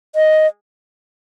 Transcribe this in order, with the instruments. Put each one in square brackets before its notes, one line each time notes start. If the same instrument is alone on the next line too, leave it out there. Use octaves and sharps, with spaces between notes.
[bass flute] D#5